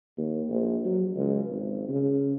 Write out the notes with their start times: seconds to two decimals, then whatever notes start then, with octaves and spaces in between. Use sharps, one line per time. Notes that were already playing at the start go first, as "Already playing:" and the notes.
0.17 D#2
0.49 A#1
0.85 F#3
1.16 C#2
1.48 G#1
1.88 C#3